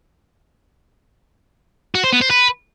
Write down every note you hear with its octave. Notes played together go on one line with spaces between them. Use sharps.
F#4
C5
B3
C5
B4